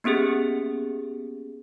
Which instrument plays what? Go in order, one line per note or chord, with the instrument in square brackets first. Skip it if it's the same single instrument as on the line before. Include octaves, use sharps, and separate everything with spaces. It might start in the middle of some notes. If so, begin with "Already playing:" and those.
[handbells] A#3 B3 C#4 G4 G#4